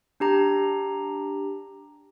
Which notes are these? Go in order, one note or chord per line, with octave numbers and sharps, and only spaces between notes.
D4 G4 A#5